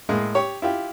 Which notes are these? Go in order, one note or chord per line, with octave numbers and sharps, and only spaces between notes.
A2 G#3 A#3
G4 C#5
E4 F4 G4